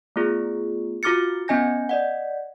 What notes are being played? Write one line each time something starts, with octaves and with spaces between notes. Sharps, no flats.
A3 B3 F4 G#4
F4 F#4 D6 F6 A6 C#7
B3 C#4 D#5 G#5 G6 A#6
D5 D#5 F#5